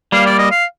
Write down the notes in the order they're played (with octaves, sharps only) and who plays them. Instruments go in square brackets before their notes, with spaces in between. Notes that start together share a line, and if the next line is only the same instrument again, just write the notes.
[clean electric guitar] G3 A#3 [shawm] F5
[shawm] D5
D#5
F5